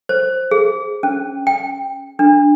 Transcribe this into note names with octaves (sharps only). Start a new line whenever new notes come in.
C5
G#4
C#4
G5
D4